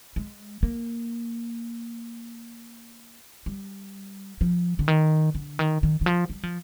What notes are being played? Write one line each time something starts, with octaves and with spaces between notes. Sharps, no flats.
G#3
A#3
G3
F3
D3
D#3
D3
D#3
D#3
D#3
F3
G3
F3